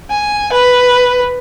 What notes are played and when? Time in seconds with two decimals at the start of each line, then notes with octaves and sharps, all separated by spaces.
0.10 G#5
0.52 B4